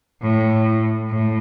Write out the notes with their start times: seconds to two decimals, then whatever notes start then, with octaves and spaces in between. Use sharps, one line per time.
0.22 A2
1.10 A2